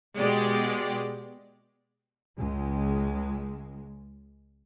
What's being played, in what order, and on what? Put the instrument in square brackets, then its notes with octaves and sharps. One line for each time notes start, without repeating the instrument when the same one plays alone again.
[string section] B2 G#3 G4 D5
[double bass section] C#2 G#3